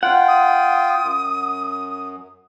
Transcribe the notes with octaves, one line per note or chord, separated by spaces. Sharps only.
F4 F#5 G5
D#6
F#2